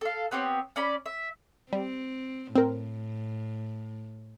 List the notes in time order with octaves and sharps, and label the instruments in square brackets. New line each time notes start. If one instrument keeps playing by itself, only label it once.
[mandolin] A4 F5
B3 C4 G4 C#5
C#4 D5 B5
E5
[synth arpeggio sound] G3 [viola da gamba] C4
[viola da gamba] A2 [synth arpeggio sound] C4 A#4